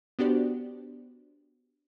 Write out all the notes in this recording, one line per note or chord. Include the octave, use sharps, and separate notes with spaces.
B3 D4 F#4 G4 C5 D5